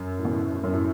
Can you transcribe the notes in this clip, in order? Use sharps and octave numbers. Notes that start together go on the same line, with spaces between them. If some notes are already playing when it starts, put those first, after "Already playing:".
Already playing: F#2
A2
B2
A2
A2
F#2
A2